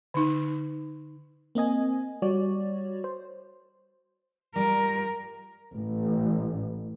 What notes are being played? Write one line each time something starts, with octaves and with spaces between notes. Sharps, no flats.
D3 D#4
A#3 C4 D#5 G#5
G3 F#4 C#5 D5
C5
G3 F4 A#4
A1